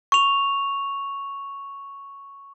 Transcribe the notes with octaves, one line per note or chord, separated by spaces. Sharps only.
C#6 F7